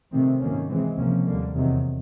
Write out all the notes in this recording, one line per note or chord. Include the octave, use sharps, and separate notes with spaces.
C3 D#3 F#3 A3 C4
G#2 D#3 F#3 A#3 C#4
C3 E3 G#3 C4
C#2 C3 F3 A#3 C#4
D#2 D3 G3 A#3
E2 C3 D#3 F#3